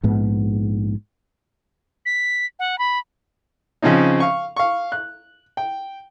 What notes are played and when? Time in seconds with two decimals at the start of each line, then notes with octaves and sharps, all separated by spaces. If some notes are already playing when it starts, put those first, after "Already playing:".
0.03 A#1 G#2 B3
2.06 B6
2.59 F#5
2.79 B5
3.82 C#3 F3 C4 C#4 D#4
4.20 F5 C#6
4.57 F5 C#6
4.92 F#6
5.57 G5